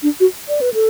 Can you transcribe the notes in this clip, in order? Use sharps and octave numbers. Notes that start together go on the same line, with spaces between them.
D4
F#4
D5
B4
A4